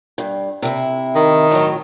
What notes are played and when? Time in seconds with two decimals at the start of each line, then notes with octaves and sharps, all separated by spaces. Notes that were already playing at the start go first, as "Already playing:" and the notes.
0.18 G2
0.62 C3 E4
1.16 D#3
1.51 A2 F#3